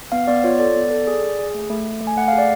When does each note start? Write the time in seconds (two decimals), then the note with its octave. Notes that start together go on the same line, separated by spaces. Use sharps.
0.12 B3 F5
0.27 B3 D5
0.44 F4 C#5
0.59 A4 D5
0.76 B3
0.91 A4
1.07 G#4
1.23 G#4
1.39 G#4
1.54 A3
1.70 A3
1.85 A3
2.01 A3
2.07 G#5
2.17 A3 F#5
2.28 G#4 F5
2.38 D5